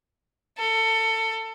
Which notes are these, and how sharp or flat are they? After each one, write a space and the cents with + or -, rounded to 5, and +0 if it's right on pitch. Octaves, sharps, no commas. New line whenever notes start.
A4 +25